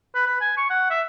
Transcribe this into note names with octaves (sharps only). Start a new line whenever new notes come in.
B4
B4
G#5
C#6
F#5
E5